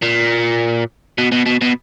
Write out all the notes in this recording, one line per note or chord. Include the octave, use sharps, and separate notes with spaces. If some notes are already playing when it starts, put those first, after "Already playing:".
A#2
B2
B2
B2
B2